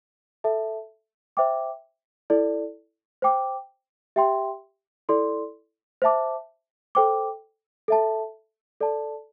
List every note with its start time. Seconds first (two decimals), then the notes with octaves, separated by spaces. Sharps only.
0.44 A4 E5 A5
1.37 C5 E5 G5 D6
2.30 E4 A4 D5
3.22 C5 G5 D6
4.16 G4 E5 G5 C6
5.09 E4 A4 D5 C6
6.02 C5 E5 A5 D6
6.95 A4 C5 G5 D6
7.88 A4 E5 A5
8.81 A4 D5 A5